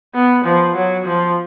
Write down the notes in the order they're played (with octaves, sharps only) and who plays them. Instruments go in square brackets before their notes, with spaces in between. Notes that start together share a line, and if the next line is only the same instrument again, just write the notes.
[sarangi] B3
F3
F#3
F3